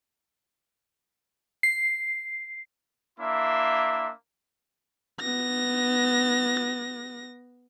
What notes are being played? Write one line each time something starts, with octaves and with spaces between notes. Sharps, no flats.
C7
A#3 D4 E4 E5 C6
B3 A#6